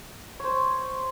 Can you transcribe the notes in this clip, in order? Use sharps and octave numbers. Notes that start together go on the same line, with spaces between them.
C5 C#5